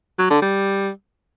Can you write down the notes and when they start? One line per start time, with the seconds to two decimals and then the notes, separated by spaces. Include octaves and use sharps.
0.19 F#3
0.30 D3
0.42 G3